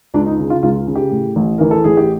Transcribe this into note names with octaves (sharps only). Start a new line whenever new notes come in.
C#2 D4
D#4
C#3
F4
C#2 F4
C#3
G4
A2
A1
E3 A#4
A4
A1 G#4
G4